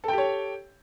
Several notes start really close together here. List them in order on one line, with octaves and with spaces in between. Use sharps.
A4 G5 G4 C#5